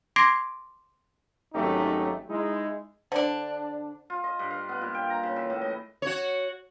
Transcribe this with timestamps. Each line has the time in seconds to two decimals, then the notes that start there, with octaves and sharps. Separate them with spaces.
0.16 C6 D6 G#6 A#6 C7 D7
1.54 G#1 F#3 A3 C#4 D#4 G4
2.28 G#3 D#4 E4
3.12 D3 D4 C5 D5
4.10 F4
4.24 D#5
4.39 G2
4.51 F5
4.69 B3
4.82 A#2
4.94 G5
5.10 A#5
5.23 C#3
5.36 E3
5.50 A2
5.62 D#5
6.02 F#4 C#5